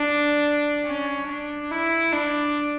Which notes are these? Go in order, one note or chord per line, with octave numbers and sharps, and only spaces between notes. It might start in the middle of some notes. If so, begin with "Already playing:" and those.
Already playing: D4
C#4
D4
E4
D4